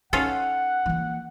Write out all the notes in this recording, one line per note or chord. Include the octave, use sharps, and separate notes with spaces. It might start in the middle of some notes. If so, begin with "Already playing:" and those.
C#4 D#4 F4 A4 F#5
E3 A#3